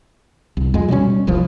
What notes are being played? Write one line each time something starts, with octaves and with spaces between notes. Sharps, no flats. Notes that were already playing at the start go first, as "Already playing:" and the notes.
C2
F2 G#3
B2 G3 B3 C#4
E1 C2 F3